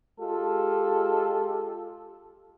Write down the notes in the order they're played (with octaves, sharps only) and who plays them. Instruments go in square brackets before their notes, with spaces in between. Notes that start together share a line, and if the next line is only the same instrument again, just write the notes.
[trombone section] G#3 F4 G4 A4